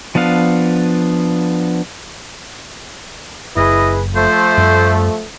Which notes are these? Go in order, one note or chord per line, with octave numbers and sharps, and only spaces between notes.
F3 B3 D4 F5
F#1 E4 G#4 B4 D#5
F3 A3 C5
F#2 G3